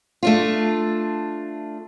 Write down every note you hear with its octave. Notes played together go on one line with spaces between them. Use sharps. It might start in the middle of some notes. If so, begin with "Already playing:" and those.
A3 D4 F4